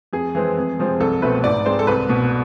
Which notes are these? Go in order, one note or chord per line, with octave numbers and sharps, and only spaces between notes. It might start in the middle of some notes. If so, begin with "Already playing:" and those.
F2 G#4
E3 G#3 C4
F2
C3 F3 G#3 C4
C2 A4
B2 A3 C4 B4
G#2 D5
G#3 C4 C5
A4
C2 B4
B2 B3